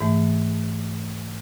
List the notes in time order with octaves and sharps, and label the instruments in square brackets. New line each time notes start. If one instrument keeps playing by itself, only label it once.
[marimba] G#2 E3 A3